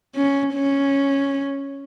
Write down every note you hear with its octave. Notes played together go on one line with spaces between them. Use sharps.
C#4
C#4